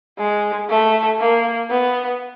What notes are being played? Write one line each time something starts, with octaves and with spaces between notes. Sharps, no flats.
G#3
A3
A#3
B3